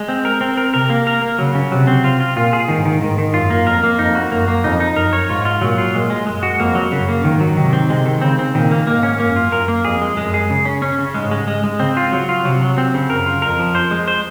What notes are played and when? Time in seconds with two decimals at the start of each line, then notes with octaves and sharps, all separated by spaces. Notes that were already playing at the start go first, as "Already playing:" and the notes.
Already playing: G#3
0.09 C4
0.25 A#4
0.41 C4
0.57 A#4
0.74 C3 A#4
0.90 A#3
1.07 A#4
1.22 A#3
1.39 C#3 F#3
1.55 C#3
1.72 C3 F#3
1.87 C4
2.04 C3 F4
2.20 F4
2.36 A#2 F4
2.53 G#4
2.68 G#2 D#3
2.85 D#3
3.02 G#2 D#3
3.18 D#3
3.34 F#2 F4
3.50 A#3
3.66 F2 A#4
3.83 A#3
3.99 F2 D#4
4.15 F#4
4.32 F#2 A#3
4.48 A#3
4.64 F2 D#4
4.80 D#4
4.96 F#2 A#4
5.13 C#5
5.29 G#2 F4
5.45 F4
5.61 A#2 F#3
5.78 F4
5.94 A#2 G#3
6.10 G#3
6.26 F#2 G#3
6.43 F#4
6.60 F2 A#3
6.75 F#3
6.92 F#2 C#3
7.09 A#3
7.24 G#2 D#3
7.41 F#3
7.57 C3 D#3
7.73 C4
7.90 C3 G#3
8.06 D#3
8.21 C#3 C4
8.39 C4
8.54 A#2 D#3
8.71 A#3
8.87 G#2 A#3
9.03 C#4
9.20 F#2 A#3
9.36 F4
9.52 F#2 A#4
9.68 A#3
9.85 F2 G#4
10.02 G#3
10.17 F#2 G#3
10.34 G#4
10.50 C#3
10.65 C#4
10.82 C#4
10.99 C#3
11.14 G#2 G#3
11.31 G#3
11.48 G#3
11.64 G#3
11.80 C#3 C4
11.97 F4
12.13 F#3
12.29 F4
12.45 C3 F#3
12.61 F#3
12.78 C4
12.94 C#3
13.10 F#2 A#4
13.26 F4
13.42 F2 A#4
13.59 F3
13.75 C5
13.91 G#3
14.08 C5